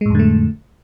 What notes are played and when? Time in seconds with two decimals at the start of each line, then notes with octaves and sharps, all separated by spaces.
0.01 G#3
0.06 A2
0.10 F2
0.15 D3
0.19 A3